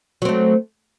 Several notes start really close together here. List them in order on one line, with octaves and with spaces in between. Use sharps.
F#3 C4 A3